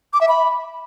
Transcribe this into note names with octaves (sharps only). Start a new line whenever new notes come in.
D6
E5
B5